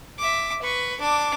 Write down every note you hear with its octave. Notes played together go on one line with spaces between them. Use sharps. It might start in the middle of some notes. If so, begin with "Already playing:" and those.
E5 D6
B4 C#6
D4 D6